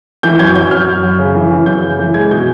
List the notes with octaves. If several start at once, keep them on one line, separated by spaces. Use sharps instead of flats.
E3 G6
F#2 G#6
F#2 G6
F#2 F6
F#2
F#2
C#3
E3
E3
F#2 G6
C#3
E3
G#3 G#6
B2 G6